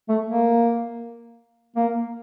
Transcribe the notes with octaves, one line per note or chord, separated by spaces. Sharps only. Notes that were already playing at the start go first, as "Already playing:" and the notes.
A3
A#3
A#3